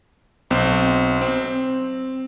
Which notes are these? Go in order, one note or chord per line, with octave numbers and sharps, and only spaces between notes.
B1 C4
C4